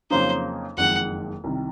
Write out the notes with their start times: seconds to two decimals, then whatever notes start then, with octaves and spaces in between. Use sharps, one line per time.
0.11 F2 C#3 F#3 A#3 D#4 C5
0.77 F#1 F2 D#3 G#3 F#5
1.44 C2 C3 D#3